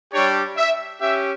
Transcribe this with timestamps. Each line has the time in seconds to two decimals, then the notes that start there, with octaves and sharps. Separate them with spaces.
0.13 G3 D4 G4 C#5
0.57 E5
1.01 C#4 G4 E5